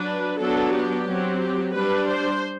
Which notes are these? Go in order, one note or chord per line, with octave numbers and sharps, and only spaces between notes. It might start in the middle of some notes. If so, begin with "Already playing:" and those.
Already playing: F#3 D4 B4
F#3 B3 D4 A4
G4
F#3 C4
G4
G3 D4 B4
C5